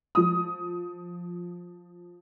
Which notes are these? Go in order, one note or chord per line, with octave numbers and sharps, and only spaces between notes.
F3 D#6